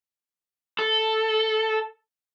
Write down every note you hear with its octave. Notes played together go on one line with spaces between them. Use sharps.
A4